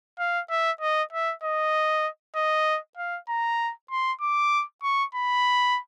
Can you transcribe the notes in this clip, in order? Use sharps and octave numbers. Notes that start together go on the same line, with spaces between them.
F5
E5
D#5
E5
D#5
D#5
F5
A#5
C6
D6
C#6
B5